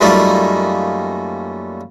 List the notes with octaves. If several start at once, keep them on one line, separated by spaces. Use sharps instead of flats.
F#2 G3 A3 A#3 D#4 F4